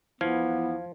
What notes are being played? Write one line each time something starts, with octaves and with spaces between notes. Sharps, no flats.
E2 E3 F3 B3 F5 G#6